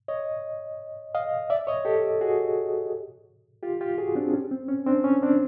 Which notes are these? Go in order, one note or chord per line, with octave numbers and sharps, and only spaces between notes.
C#5 D#5
D#5 F5
D5 E5
C#5 D#5
G4 A4
F#4 G#4
F4 G4
F4 G4
F#4 G#4
C4 D4
C#4
C4
C#4
C4 D4
C#4
C4 D4